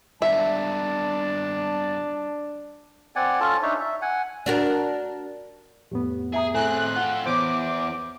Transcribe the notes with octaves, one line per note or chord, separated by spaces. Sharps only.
G2 D4 F4 E5 A5
C4 D5 F#5 G#5
C#4 F4 A4 A5
D4 D#4 C#5 E5
E5
F#5 G#5
D4 F#4 A#4
F2 A2 B3 G4
G#4 E5 A#5 D#6
A2 C4 G#4 A4 E5 G#5 F#6
F4 A4 F#5
E2 C5 C#5 D6 G6